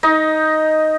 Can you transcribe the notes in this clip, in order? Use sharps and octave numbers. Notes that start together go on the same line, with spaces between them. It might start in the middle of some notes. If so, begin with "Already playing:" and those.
D#4 D#5